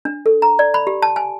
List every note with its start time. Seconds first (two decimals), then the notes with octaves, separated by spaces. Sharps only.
0.05 D4
0.26 A4
0.42 A#5
0.59 D5
0.74 B5
0.87 G4
1.02 A5
1.16 G#5